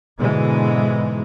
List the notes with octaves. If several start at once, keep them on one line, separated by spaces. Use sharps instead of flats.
G#2 B2 D3 E3 G#3